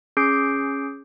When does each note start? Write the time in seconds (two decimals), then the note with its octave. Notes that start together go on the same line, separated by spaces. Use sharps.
0.17 C#4 G#4 D6 G6 C7 D7